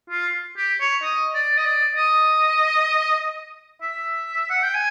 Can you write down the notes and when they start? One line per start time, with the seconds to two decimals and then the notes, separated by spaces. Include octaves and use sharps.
0.10 F4
0.56 G4
0.80 C#5
1.03 D#5
1.34 D5
1.57 D#5
1.65 D5
1.96 D#5
3.82 E5
4.50 F#5
4.63 G5
4.74 G#5